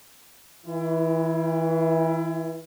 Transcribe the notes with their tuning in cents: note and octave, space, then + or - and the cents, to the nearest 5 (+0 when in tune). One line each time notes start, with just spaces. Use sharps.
E3 -25 E4 +30